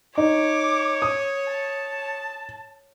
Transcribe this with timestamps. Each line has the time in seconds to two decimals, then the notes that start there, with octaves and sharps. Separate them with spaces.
0.17 D#4 C#5 D6
1.02 D#6
1.49 A5